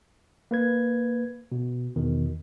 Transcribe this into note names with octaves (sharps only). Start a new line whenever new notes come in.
A#3 B4 G#6
B2
E2 B2 D#3